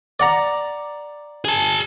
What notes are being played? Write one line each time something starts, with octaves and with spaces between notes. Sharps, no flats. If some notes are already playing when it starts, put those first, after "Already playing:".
D5 F#5 A#5
G#4 A5